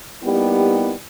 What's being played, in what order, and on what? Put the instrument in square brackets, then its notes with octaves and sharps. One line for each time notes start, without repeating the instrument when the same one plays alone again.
[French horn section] G3 A#3 B3 D#4 E4 G4